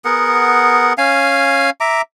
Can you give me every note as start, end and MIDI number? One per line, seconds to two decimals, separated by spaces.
0.05 0.93 59
0.05 0.93 68
0.05 0.93 70
0.05 0.93 78
0.98 1.70 61
0.98 1.70 77
0.98 1.70 80
1.80 2.02 76
1.80 2.02 82
1.80 2.02 86